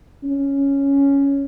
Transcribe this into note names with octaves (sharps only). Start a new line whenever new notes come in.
C#4